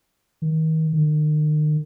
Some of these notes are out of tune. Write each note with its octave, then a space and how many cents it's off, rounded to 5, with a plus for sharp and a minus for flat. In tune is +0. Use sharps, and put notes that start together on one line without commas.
D#3 +35
D#3 -40